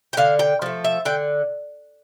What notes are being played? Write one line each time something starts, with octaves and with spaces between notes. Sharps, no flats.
G5
D3 F5
G5
F3 A3
E5
D3 G5